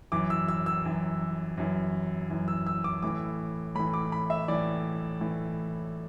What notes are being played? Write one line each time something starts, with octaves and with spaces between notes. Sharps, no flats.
F#2 E3 D6
E6
E6
E6
F#2 E3
F#2 E3
F#2 E3
E6
E6
D6
A2 E3 D6
A2 E3 B5
D6
B5
E5
A2 E3 D5
A2 E3